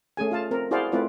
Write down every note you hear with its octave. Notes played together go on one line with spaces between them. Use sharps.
A3 C#4 G#4 G#5
F4 F5 A5
C4 A#4
E4 F#4 G#4 C5 D5 F5
A3 C4 E4 F4 B4 D5